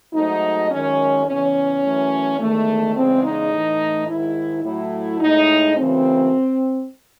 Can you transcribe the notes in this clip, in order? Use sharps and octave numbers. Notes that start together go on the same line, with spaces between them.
G#2 F#3 A3 D#4
F#2 D#3 G#3 C#4
E2 C#3 E3 C#4
F#2 E3 A3
E2 D#3 G#3 A3
E2 C#3 G#3 C4
D#4
A2 E3 A3
G#2 D#3 G#3 E4
A2 F#3 A3 E4
A2 G#3 D#4
F#2 C#3 E3 A3 C4